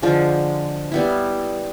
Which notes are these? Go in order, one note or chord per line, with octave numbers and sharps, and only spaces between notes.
D3 F3 G#3
G3 B3 E4